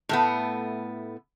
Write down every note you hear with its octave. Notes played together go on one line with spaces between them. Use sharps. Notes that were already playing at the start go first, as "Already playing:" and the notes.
A2 A3 B3